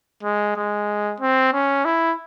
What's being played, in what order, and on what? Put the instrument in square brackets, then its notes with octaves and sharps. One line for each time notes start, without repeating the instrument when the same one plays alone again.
[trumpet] G#3
G#3
C4
C#4
E4